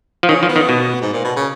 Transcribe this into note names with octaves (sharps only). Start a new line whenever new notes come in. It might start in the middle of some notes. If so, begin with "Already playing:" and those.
F3
D#3 C#4
F3
B3
D#3
B2
G#2
A#2
B2
C#3